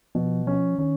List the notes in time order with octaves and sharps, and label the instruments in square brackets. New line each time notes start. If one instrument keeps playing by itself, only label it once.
[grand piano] B2 [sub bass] F3
[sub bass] F3 [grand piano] C#4
[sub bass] D#3 [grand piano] C#4